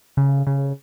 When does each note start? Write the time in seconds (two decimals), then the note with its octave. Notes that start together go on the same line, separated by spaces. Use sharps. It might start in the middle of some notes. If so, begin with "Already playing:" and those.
0.17 C#3
0.47 C#3